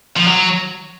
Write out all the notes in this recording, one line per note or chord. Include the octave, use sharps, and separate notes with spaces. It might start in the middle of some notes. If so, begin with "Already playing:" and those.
F3
F#3